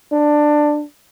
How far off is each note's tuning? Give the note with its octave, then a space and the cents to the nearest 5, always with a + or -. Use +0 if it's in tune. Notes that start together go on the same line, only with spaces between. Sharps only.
D4 +15